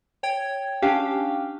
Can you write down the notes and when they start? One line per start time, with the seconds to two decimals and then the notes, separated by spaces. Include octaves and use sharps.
0.23 C#5 G5 G#6
0.82 C#4 D4 G4 F5 G5